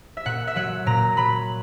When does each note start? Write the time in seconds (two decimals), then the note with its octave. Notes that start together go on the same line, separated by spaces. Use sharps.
0.17 E5
0.25 A#2 F#5
0.47 E5
0.56 F#3 F#5
0.86 A#2 A#5
1.17 F#3 B5